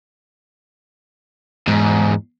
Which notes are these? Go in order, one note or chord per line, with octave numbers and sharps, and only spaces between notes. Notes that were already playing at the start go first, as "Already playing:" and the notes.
E2 G#2